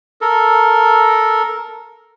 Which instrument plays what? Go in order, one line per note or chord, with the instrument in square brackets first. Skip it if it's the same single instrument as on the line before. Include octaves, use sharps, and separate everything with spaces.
[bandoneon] A4 A#4